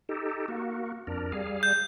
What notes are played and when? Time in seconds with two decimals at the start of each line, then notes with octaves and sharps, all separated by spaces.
0.09 D#4 G4 A4
0.48 A#3 F#4
1.07 F2 D4 A#4
1.32 G3 G#4 F5
1.63 G6